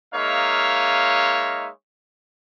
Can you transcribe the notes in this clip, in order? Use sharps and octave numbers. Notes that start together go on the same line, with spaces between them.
G#3 A#3 D#4 C#5 E5 F5